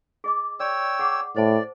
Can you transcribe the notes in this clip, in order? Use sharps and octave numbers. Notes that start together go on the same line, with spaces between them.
G#4 D#5 D6
C#5 D5 G5 E6
G#4 F#5 D6
A2 C5 D5 A5